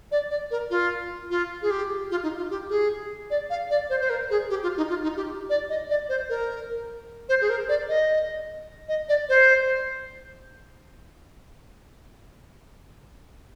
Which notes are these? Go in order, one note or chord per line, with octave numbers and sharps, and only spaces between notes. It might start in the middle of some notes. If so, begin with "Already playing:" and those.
D5
D5
A#4
F4
F4
G#4
G4
F4
D#4
F4
G4
G#4
D5
F5
D5
C5
C5
A#4
G#4
G4
F4
D#4
F4
D#4
G4
D5
D#5
D5
C5
A#4
C5
G#4
A#4
D5
D#5
D#5
D5
C5